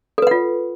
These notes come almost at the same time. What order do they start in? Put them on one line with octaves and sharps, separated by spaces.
A4 B4 F#5 F4